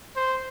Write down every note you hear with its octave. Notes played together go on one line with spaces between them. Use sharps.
C5